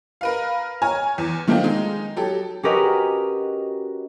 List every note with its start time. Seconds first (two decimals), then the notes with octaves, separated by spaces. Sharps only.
0.21 A#4 B4 F5
0.82 C#5 G#5 A#5 F6
1.18 E2
1.48 D#3 A3 C4 D4 D#4 F4
1.63 G#3 D#4
2.16 F#3 G4 A4
2.63 C#4 F#4 G4 A#4 B4 D#5